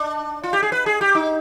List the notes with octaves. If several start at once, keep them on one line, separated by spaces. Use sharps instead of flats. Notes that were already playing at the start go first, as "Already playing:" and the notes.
Already playing: D4
F4
G4
G#4
B4
G#4
G4
D#4